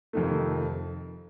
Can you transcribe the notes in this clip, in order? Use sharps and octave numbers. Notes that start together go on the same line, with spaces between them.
F2 C3 D#3 A3